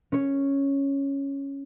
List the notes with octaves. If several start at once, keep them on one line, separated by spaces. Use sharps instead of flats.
C#4 C#5